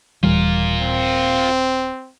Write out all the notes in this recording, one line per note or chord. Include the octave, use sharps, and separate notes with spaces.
D#1 E3 G3 F4 A#4
C4